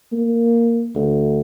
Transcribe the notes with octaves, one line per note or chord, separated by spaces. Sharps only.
A#3
D2